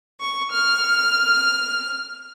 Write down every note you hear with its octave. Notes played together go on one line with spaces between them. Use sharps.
C#6
F6